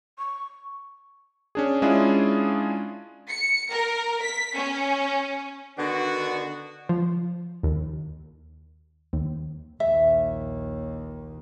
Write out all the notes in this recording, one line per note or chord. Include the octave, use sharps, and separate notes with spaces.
C#6
C#4 D4 G#4
G#3 C#4 D4 E4 F4 G#4
C#7
A#4
B6
C#4
D3 D#3 B3 D4 F#4
F3
D#2
D#2
A#1 D#2 E5